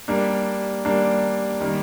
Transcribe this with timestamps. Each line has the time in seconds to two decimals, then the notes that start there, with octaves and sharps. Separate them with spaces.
0.08 G3 A#3 D4
0.85 G3 A#3 D4
1.60 D#3 G3 A#3